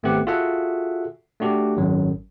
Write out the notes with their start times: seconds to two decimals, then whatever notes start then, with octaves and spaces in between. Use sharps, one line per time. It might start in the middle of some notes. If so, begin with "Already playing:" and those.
0.03 G#1 A3 B3 C4 G4 F#5
0.27 F4 F#4 G#4 A4 E5 F#5
1.40 A3 D4 F#4 G4
1.77 G#1 F#2 F#3